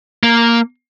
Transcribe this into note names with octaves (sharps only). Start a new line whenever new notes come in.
A#3